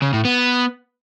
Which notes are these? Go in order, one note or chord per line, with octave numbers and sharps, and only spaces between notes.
C#3
A2
B3